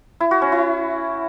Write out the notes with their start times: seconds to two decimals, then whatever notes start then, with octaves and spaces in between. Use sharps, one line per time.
0.21 E4
0.31 F#4
0.42 C#4
0.52 E4